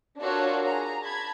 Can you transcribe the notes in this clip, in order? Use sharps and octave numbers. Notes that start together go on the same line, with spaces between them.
D4 F4 F#4 A4 A#4 C#5
G#4 A#5
A5 B5 G#6